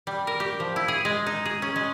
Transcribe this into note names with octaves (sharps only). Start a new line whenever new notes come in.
G3
A#4
G4
F3
E4
G#4
G#3
D#4
G#4
C#4
G#3